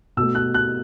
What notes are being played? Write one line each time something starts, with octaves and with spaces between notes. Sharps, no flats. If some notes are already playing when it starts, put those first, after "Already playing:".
B2 A3 E6
F#6
F#6